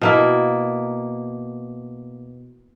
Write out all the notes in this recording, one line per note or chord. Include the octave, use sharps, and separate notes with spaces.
B2 A#3 E4